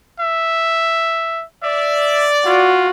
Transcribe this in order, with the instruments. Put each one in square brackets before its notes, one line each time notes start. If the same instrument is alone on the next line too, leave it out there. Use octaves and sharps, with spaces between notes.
[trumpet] E5
[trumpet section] D5 [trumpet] E5
[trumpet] F4 [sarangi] F#4